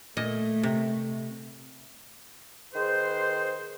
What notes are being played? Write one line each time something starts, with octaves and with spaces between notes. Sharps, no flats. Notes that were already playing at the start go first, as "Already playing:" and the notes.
A#2 A3 D#5
C3
D#3 G#4 B4 C5